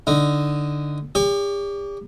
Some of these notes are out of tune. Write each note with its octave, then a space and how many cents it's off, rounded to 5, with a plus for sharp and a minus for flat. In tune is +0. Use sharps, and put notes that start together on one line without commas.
D3 +0 D#4 +0
G4 +40 D5 -40